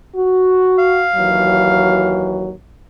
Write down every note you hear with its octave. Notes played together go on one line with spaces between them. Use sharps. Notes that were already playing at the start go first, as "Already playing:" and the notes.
F#4
F5
D#2 E3 F#3